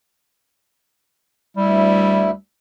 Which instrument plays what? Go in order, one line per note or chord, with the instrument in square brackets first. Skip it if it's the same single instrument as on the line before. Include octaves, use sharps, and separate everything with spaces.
[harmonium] D2 E4 [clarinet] G3